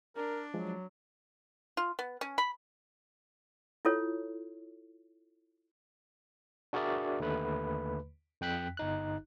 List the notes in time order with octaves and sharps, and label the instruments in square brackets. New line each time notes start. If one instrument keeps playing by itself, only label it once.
[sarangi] D4 [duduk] A#4
[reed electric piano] F3 G#3 [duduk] F#3
[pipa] F4
B3
C#4
B5
[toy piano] E4 F4 A4 C#5
[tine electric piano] D4 F#4 G#4 A#4 D5 E5
D#2 D3 A3 B4 B5
F2 G5 F#6 B6
G1 D#4 F#6